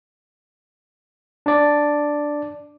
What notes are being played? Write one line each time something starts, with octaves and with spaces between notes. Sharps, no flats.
D4 D5